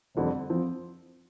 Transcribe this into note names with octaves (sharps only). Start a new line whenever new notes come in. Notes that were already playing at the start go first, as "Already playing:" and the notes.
F1 F2 D3 G3 C4
F3 C4